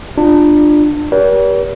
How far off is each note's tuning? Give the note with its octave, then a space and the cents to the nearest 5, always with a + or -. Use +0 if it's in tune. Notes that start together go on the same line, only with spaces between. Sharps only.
D4 +25 F4 +0
G4 +0 B4 -45 D5 -45